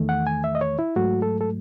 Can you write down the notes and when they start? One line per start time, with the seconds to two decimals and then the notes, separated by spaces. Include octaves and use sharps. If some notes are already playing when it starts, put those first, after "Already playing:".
Already playing: E2 D#3 A3
0.09 F#5
0.27 G#5
0.44 E5
0.55 D#5
0.61 C#5
0.79 E4
0.96 G#2 F#3 A3 F#4
1.22 A4
1.41 A4